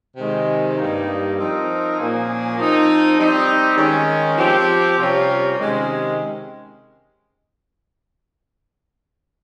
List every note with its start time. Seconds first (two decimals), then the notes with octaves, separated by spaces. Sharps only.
0.17 C3 D#3 G#3
0.77 G2 G3 A#3 D#4
1.37 F3 C4 D#4 A#4
1.98 A#2 F3 A#3 C#4 G#4
2.57 F3 C4 D#4
3.17 G3 C4 D#4 G4
3.77 D#3 G#3 C#4
4.38 F3 C4 G4
4.98 C3 G3 C#4 F4 A#4
5.58 C3 D#3 G#3 C#4